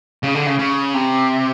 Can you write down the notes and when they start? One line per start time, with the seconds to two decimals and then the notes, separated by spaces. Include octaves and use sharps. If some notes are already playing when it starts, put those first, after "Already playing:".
0.23 C#3
0.35 D3
0.46 C#3
0.59 C#3
0.94 C3